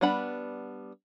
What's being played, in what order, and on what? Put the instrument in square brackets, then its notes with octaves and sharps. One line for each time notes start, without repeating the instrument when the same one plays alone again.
[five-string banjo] G3 B3 D4 F#5 B5